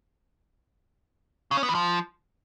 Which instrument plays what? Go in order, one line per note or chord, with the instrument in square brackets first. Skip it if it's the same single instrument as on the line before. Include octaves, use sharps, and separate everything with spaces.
[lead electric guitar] C#3
C#4
B3
E3
F3